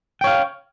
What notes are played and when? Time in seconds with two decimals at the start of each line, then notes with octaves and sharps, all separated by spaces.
0.21 G5
0.24 C#5
0.27 F5